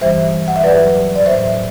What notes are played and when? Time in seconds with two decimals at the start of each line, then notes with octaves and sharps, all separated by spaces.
0.01 G2 E3 G3 C5 E5
0.48 F#5
0.56 E5
0.64 G2 F#3 B4 D5
1.16 D5
1.26 A2 F#3 C5 E5